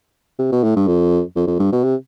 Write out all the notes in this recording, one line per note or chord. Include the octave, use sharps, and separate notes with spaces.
C3
B2
A2
G2
F2
F2
F2
G2
B2
C3